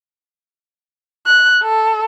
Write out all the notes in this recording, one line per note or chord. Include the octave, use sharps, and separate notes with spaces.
F#6
A4